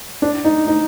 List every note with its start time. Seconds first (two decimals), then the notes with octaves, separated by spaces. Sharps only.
0.22 D4
0.45 D#4
0.67 D#4